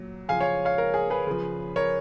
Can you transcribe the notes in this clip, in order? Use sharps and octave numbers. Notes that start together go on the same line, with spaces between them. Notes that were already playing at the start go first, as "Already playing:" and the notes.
Already playing: A#2 F#3
C#3 F3 F5 G#5
C#5 F5
C#5 F5
A#4
G#4
G#4 B4
C#3 F3
A#4 C#5